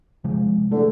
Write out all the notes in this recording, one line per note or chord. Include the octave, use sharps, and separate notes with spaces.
C3 F3 G#3
E2 D3 A3